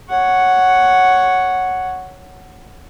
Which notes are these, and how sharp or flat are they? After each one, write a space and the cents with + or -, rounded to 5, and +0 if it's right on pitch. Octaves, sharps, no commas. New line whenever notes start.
C#5 +0 F#5 +0